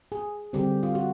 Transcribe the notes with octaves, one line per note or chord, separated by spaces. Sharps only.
G#4
D3 G3 C4 G4
F4
F#4